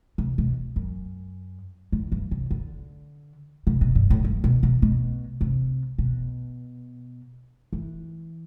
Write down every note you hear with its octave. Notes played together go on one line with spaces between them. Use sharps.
C3
B2
F#2
A2
G2
C3
D3
C3
B2
G2
A2
G2
B2
B2
B2
C3
B2
E3